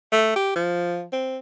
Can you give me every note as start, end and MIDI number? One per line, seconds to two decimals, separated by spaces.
0.12 0.32 57
0.36 0.53 67
0.55 1.05 53
1.13 1.38 60